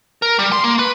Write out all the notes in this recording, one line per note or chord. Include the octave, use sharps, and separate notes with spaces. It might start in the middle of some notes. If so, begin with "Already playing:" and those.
A#4
G3
C6
A#3
B4